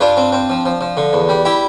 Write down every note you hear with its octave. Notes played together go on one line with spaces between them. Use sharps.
G2 D4 F4
C4
C4
F3
F3
F3
D3
E2
G3
E4 G4